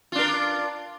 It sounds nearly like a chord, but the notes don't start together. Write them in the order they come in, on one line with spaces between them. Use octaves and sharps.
F4 D4 A#4